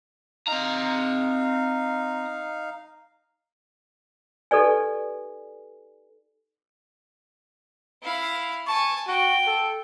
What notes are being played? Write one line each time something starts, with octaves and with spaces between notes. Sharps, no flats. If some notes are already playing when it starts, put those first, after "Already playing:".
C4 D#4 F5 A#5
D#4 G4 A4 B4 D5 G#5
E4 F5
G#5 A5 C#6
F#4 G5
A4